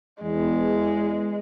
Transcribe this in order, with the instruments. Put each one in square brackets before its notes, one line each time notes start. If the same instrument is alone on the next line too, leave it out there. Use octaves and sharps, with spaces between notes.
[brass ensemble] E2 [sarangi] G#3